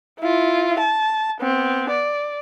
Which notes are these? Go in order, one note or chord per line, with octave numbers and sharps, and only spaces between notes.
E4 F4
A5
B3 C4
D5